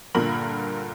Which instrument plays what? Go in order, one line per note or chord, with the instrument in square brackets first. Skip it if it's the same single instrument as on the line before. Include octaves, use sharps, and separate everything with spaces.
[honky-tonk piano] G2 A#2 D3 A#4 B5 F#7